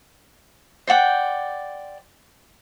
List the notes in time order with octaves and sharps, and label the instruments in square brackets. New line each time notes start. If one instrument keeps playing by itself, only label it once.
[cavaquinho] C5 D5 F#5 G5